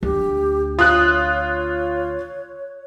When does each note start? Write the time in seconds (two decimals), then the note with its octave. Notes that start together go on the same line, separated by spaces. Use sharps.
0.03 D2 G4
0.79 F4 C#5 D#6 F#6